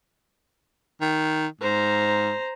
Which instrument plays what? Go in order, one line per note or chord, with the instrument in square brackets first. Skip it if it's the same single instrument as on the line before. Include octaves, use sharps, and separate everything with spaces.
[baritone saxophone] D#3
[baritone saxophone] G#2 [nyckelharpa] C5 A#5